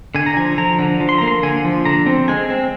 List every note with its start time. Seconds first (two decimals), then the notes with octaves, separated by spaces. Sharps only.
0.15 D3 G#5
0.26 A#5
0.37 F3 G#5
0.58 F3 A#5
0.79 D3
1.00 F3
1.09 C6
1.18 A#3 A#5
1.28 C6
1.43 D3 G#5
1.65 F3
1.85 D3 A#5
2.06 C4
2.28 G#3 G#5
2.50 C4